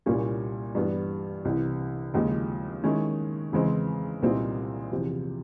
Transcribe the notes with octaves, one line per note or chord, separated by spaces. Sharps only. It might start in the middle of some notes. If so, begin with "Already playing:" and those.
C2 A#2 G3 A#3 C#4
G2 E3 G3 B3
C2 C3 E3
D#2 C#3 F3 G#3
D#3 G#3 C#4 E4
E2 C#3 E3 G#3 C4
C2 A#2 G3 C4 D#4
E2 C3 F3